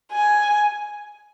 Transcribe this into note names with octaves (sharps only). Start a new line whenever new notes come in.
G#5